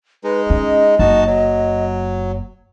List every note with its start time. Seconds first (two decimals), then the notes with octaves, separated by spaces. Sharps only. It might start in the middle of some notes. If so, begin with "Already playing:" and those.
0.24 G#3 D#4 B4
0.50 C#4 D#5
0.99 F#1 D#4 F#4 A5
1.26 F#3